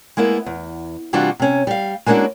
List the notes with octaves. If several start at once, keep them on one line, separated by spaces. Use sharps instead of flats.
G#3 A#3 B3 E4
E2
C3 E3 G3 D4 F4 F#4
C3 C#4
G3 F5
G#3 A#3 C#4 D4 E4 F#4